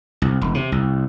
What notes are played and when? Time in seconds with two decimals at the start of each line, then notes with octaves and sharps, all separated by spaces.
0.22 C2
0.42 E1
0.55 C3
0.72 C2